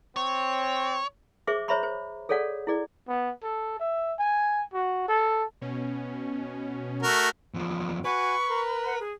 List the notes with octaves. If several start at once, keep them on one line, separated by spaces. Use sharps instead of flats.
C4 C#5
G#4 C5 E5 C#6 D6
C5 C#5 E5 A#5 B5 C#6
C5
G#4 A4 C#5 D5 F#5
E4 G#4 D5
B3
A4
E5
G#5
F#4
A4
B2 C#4
A3 F#4 A#4
E2 F3
F#4 B4 G#5 C#6
A#4
F#5
G#4